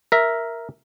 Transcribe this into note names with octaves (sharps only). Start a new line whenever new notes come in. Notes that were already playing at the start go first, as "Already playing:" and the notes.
A#4 E5